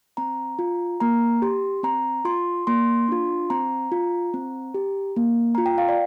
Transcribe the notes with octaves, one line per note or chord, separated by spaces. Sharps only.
C4 A#5
F4
A#3 A#5
G4 C6
C4 A#5
F4 C6
A#3 C6
D4 F4
C4 A#5
F4
C4
G4
A#3
F4 A#5
G5
F5
D5